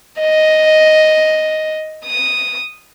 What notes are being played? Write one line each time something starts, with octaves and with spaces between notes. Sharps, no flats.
D#5
D#6